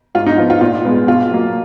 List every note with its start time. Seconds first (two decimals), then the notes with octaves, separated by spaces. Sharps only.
0.15 G#2 F4
0.26 D#4
0.38 F3 B3 F4
0.50 F4
0.61 A#2 F4
0.85 G#3 B3
1.07 B2 F4
1.31 F#3 A#3